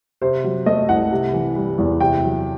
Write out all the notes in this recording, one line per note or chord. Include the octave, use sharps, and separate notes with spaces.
C3 C5
F#3
A3 D#5
C2 F#5
C3
E3
G3
E2
C3 G5
F#3